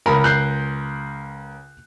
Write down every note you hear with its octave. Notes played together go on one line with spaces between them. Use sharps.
C#2 A#4 B5
F#6 G6 C7